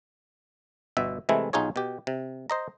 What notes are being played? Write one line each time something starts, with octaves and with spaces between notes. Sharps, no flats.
G1 B2 E5
C3 E3 G#3 A3 E4
B1 D#4 F4 G#4 C#5
B2 G4
C3
C5 D#5 A#5